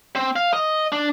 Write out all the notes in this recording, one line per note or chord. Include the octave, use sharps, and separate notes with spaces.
C4
F5
D#5
D4